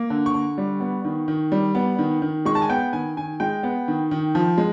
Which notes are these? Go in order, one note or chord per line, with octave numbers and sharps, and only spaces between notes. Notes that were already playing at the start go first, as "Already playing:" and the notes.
Already playing: A#3
D3
C#6
D3
G3
B3
D#3
D#3
G3
B3
D#3
D#3
G#3 C#6
A5
G#5
B3 G5
D#3 G#5
D#3 G#5
G#3 G5
B3
D#3
D#3
F3
G#3